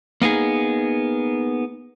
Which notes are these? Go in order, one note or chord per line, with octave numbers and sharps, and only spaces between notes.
A#3 B3 D#4 G#4